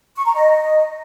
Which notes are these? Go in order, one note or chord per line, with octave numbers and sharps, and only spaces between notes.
C#6
A#5
D#5